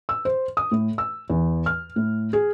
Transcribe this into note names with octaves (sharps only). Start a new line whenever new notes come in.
E6
C5
D#6
A2
E6
E2
F6
A2
G#4